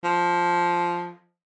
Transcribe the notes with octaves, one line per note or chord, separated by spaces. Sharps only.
F3